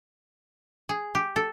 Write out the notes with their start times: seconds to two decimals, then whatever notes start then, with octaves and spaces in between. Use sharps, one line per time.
0.89 G#4
1.15 G4
1.36 A4